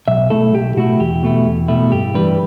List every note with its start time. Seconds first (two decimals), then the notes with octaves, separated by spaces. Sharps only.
0.08 B1 E5
0.30 B2 A3 E4 A4
0.54 B1 G4
0.76 B2 A3 E4 F#4
1.00 E2 G4
1.23 B2 A3 E4
1.46 E2
1.68 B2 A3 E4
1.91 G2 G4
2.14 E3 G3 D4 B4